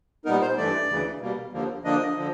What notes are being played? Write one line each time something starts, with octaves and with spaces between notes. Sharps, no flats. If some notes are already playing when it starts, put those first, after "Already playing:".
A#2 G3 B3 D#4 A#4
C5
G2 E3 A3 D5
D2 C#3 E3
B2 G3 A#3
D#2 D3 F3 A#3
D3 F3 A#3 D4 D#5
D3 F3